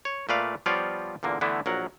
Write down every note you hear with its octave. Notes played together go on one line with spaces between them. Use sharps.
C#5
A#2 A3 B4 D5 F5
F3 G3 B3 F4 C#5 D5
E2 A#2 D3 A#3
D3 E3 A3 B3 D4 E4
A#1 F#3 A#4 F#5